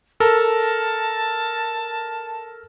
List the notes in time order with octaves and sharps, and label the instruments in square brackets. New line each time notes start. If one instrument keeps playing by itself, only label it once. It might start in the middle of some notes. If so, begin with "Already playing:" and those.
[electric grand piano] A4 A#4 [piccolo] A5